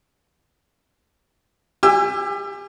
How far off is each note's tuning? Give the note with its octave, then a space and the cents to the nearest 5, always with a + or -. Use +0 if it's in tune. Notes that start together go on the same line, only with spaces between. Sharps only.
G4 +30 G#5 -25 E6 +35